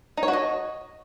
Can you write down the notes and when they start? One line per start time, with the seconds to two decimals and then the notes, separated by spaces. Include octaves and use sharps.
0.17 D#4
0.23 C#5
0.28 F#4
0.33 D#5